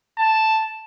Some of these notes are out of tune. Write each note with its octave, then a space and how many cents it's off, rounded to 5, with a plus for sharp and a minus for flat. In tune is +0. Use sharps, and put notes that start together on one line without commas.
A5 +0